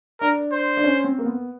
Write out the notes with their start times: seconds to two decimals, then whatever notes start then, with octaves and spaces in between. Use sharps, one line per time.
0.21 D4 A#4
0.53 C5
0.77 D4
0.84 C#4
1.04 C4
1.18 A#3
1.25 B3